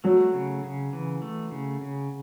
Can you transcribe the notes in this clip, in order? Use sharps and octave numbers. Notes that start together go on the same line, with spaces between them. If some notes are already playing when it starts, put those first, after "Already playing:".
F#3 A3
C#3
C#3
E3
A3
C#3
C#3